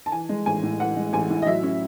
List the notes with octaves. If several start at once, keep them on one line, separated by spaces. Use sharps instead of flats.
A5
E3 G#5
G#3
A1 G#5
A2
E3 F#5
G#3
A1 G#5
A2
D#5
F#3 E5
C#4